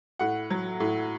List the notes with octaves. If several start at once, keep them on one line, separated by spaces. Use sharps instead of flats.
A2 F#5
F#3
A2